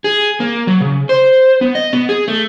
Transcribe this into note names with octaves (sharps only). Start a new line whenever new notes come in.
G#4
A#3
F#3
C#3
C5
B3
D#5
B3
G#4
A3